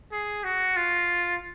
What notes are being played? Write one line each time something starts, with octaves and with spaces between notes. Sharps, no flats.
G#4
F#4
F4